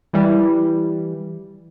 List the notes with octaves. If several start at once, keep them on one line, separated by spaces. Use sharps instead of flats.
E3 G3